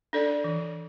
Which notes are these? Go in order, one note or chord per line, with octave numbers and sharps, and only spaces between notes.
D4 A4 D5
E3